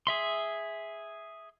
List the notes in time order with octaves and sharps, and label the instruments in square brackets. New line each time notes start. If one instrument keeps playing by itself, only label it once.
[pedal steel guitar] G#4 E5 C6